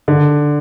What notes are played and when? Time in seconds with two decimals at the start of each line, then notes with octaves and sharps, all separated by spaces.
0.08 D3